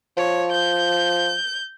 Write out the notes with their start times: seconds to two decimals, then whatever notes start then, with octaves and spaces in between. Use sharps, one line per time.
0.17 F3 C#5
0.52 G6